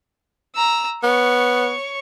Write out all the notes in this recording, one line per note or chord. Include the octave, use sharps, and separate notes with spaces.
A#5 E6
B3 C#5 C#6